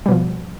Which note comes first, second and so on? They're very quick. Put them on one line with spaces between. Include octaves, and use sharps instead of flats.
G3 B2 F3